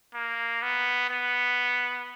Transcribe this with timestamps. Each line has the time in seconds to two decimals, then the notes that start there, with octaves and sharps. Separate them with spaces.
0.15 A#3
0.62 B3
1.10 B3